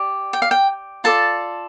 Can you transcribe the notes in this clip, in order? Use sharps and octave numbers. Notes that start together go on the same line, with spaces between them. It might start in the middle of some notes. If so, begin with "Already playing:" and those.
Already playing: G4 D5
G5
F5
G5
F4 A4 D5 A5